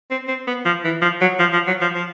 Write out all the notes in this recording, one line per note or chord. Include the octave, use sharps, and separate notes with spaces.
C4
C4
B3
F3
E3
F3
F#3
F3
F3
F#3
F3
F3